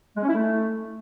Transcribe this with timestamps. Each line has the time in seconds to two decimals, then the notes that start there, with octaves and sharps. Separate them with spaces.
0.16 G#3
0.22 C#4
0.29 E4
0.35 A3